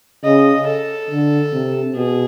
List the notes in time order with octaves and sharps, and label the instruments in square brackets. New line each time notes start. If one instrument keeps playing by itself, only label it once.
[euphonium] C#3 [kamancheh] D#5
[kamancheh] A4
[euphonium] D3
C3
[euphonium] B2 [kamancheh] G#4